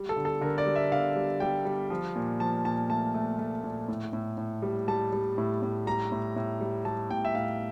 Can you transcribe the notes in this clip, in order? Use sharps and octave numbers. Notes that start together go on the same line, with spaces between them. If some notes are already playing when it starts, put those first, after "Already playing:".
Already playing: G3
A4
D3
A4
D3 A#4
D5
G3
E5
D3 F5
G3
G3 G5
G3
F3
A#2
F3 A5
A#2 A5
A3 A5
A3
A3
A#2
A2
A2
A2
G3
G3 A5
G3
A2
A2
G3 A#5
A2
A2
G3
G3 A5
A2 G5
E5
A2 F5